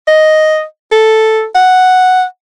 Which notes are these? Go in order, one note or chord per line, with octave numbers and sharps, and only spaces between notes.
D#5
A4
F#5